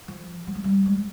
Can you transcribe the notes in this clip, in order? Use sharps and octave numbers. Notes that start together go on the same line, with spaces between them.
F3
G3
G#3
G3
G#3